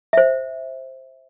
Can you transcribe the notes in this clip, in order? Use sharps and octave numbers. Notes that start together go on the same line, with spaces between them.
C5 E5